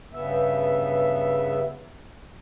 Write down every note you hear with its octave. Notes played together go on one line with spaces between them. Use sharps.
G2 C#3 B3 E5